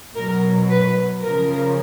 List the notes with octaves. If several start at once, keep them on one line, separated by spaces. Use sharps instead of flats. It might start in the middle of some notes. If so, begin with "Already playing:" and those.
B2 F#3 A#4
B4
C#3 F3 A#4